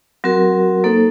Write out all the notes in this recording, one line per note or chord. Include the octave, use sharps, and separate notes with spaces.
F#3 C4 F#4 A#4
A#3 D#4 A4 C5